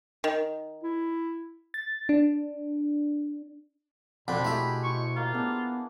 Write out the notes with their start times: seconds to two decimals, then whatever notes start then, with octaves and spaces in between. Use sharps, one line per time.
0.24 D#3
0.83 E4
1.74 A6
2.09 D4
4.28 F2 B2 D3 D4 F#4 C5 B5
4.45 A3 E4 G4 G#4 E5
4.84 E4 C#6
5.16 A#3 F4
5.34 B3 D4 G#4